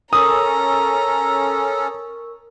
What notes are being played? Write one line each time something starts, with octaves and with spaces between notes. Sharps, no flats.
C#4 A4 A#4 A#5 C#6 D#6 E6